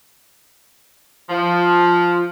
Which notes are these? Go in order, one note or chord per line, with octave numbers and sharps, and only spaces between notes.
F3